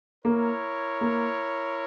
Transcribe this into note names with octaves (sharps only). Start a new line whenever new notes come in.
A#3 E4 A#4 C#5
A#3